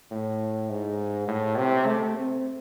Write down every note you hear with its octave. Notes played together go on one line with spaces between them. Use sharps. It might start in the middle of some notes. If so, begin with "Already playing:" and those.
A2
G#2
A2
C3
A3
C4